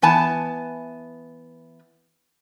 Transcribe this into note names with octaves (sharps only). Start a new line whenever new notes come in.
E3 B3 G#5 A5